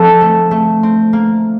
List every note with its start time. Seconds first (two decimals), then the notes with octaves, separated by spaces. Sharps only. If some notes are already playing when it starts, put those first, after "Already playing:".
Already playing: F3 C4 A4 A5
0.21 A3
0.51 A3
0.83 C4
1.13 A#3